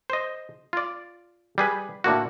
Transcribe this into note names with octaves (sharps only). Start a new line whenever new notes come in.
C5 D#5
F4 D5
G3 G#4 B4
A2 D3 A#3 F#4